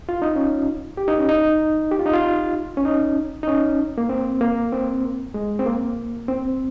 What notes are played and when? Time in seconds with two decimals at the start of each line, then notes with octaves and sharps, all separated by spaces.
0.09 F4
0.22 D#4
0.36 C#4
0.97 G4
1.08 D#4
1.18 C#4
1.29 D#4
1.91 G4
1.99 F4
2.06 D#4
2.13 F4
2.77 C#4
2.85 D#4
3.43 D#4
3.48 C#4
3.98 A#3
4.09 C4
4.41 A#3
4.72 C4
5.34 G#3
5.59 C4
5.66 A#3
6.28 C4